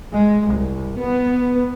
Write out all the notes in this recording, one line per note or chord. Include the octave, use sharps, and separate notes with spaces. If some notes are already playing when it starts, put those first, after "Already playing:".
G#3
C2
B3